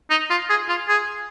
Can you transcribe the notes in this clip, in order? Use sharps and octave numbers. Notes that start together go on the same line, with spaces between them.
D#4
F4
G#4
F4
G#4